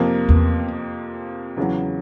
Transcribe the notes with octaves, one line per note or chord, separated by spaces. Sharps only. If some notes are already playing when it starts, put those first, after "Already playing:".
Already playing: F2 C3 F3 A#3
E2
E2 C#3 F#3